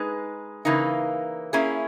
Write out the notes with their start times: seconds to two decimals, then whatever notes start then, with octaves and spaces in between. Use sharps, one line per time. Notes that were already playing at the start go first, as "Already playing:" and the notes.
Already playing: G#3 D#4 G#4 B4
0.65 C#3 E3 A#3 D#4
1.53 A#3 C#4 E4 G#4